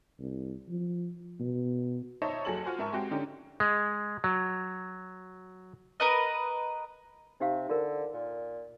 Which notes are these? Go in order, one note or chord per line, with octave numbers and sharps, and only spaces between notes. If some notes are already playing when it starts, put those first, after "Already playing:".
C2
F3
B2
D#4 C5 C#5 D#5 E5 A5
F#1 F#3 G#4 A4 A5 F#7
F4 F#4 C5 G#5
G#2 A#4 E5 G#5 A5 C#6
G#3 C4 F#4 G4
D3 C#4 D#4 G4
G#3
F#3
A#4 B4 D#5
C3 D#4 G4 F5
D3 F4 A#4 C5
A#2